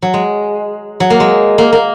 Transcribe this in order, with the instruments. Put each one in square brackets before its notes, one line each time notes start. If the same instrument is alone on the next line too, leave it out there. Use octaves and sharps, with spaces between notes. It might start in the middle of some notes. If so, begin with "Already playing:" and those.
[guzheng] F#3
G#3
F#3
A#3
G#3
A#3
A#3